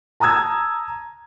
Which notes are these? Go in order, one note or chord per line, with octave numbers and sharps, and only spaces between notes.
A5 A#5 D#6 E6 G#6